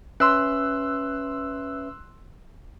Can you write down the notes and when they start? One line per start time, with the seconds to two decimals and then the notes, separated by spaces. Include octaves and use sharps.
0.20 C#4 B4 E5 C6 E6 F#6